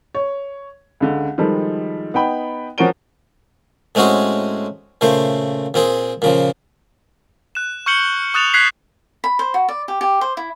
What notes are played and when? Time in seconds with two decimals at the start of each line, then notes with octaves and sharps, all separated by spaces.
0.15 C#5
1.00 C#2 D3
1.38 D#3 F3 G3 G#3 A4
2.14 B3 D#4 G5 B5
2.78 F3 C#4 F#4 A#4 D7 G7
3.95 A2 G#3 C4 C#4 F#4 G#4
5.01 A#2 C#3 A3 C5
5.74 A#2 C4 G#4
6.22 A#2 C#3 F3
7.55 F#6 E7
7.86 C#6 F6 G6 C#7 F#7 G7
8.22 F6
8.34 C#6 D#6 F#6 A6 E7 F7
8.54 F#6 G#6 B6 C7 F#7
9.24 B5
9.39 C5
9.54 F#4
9.69 D5
9.88 G4
10.01 G4
10.21 C5
10.37 E4